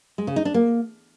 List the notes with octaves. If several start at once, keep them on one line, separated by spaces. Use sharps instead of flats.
G#3
C#3
D#4
D4
A#3